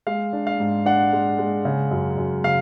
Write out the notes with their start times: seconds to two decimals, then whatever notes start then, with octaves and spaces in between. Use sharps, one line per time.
0.07 G#3 F5
0.33 D4
0.47 F5
0.60 G#2
0.86 D4 F#5
1.13 G#3
1.39 G#3
1.65 C#3
1.91 F#2
2.17 F#2
2.44 C#3 F5